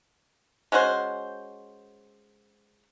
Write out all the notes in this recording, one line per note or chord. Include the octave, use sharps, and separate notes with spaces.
G#3 C#4 F#4 C5